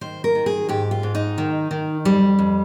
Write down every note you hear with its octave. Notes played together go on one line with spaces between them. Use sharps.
D#3 C5
A#4
D#3
G#4
G#2 G4
F4
G#2
D#4
D#3
D#3
F2 G3
F2